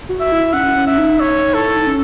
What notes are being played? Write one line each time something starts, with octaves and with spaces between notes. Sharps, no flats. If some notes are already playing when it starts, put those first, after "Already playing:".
F#4
E5
E4
C#4 F#5
C#4
E5
D#4
D#4 C#5
E4 A4
D#4
C#4